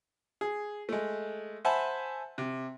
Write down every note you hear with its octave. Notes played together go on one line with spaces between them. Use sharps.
G#4
G#3 A3
C5 E5 F#5 G#5 A5 B5
C3